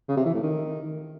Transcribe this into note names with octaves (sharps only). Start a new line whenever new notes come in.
C#3
C3
E3
A2
D#3